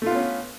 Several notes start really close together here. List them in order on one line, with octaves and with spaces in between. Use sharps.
A3 F4 B3 C#4